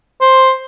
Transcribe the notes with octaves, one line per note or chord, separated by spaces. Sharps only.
C5